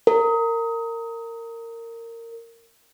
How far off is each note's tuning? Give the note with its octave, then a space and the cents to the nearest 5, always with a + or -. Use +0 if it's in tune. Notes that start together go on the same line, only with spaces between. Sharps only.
A#4 -20